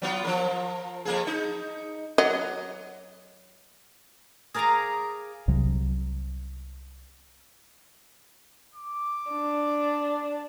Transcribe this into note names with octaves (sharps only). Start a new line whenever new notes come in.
F#3 B3 F4
F3 A#4
F2 A#3 G#4
D#4
F#3 D#5
G#4 A#4 D5 F5 G#5 A#5
C2 C3 F#3
D6
D4